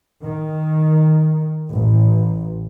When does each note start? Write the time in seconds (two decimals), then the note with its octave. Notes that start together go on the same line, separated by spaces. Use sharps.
0.23 D#3
1.72 A1